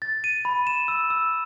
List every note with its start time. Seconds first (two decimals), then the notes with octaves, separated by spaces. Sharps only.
0.02 A6
0.24 D#7
0.45 B5
0.67 E7
0.88 E6
1.10 E6